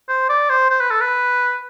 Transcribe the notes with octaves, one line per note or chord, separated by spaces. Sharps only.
C5
D5
C5
C5
B4
A4
B4